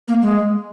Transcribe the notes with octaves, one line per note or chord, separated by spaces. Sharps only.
A#3
G#3